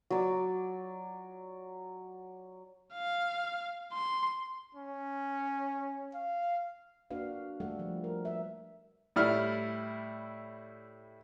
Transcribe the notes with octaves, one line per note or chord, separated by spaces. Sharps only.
F#3 D5
F5
C6
C#4
F5
A#3 D4 F#4 B4 F5
G3 A3 A4 F#5
F3
A#4
B4 E5
A2 G3 E4 F6